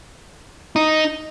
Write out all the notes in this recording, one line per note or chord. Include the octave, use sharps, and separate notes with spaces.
D#4